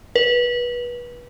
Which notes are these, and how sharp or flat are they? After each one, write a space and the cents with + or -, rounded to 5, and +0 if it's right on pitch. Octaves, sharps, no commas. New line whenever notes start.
B4 -25